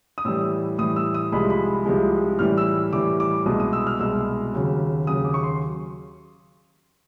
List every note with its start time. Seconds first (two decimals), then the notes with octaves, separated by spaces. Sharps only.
0.18 D#6
0.25 A2 E3 G3 E6
0.78 A2 E3 G3 D#6
0.96 E6
1.14 D#6
1.32 C2 C3 F3 G#3 B5
1.50 B5
1.86 C2 C3 F3 G#3
2.39 A2 E3 G3 F6
2.57 E6
2.93 A2 E3 G3 D6
3.20 D6
3.46 C2 B2 G#3 D#6
3.60 D#6
3.73 E6
3.87 F6
4.00 C2 B2 G#3 E6
4.53 D#2 C#3 F#3
5.07 D#2 C#3 F#3 D#6
5.25 D6
5.34 C#6
5.43 C6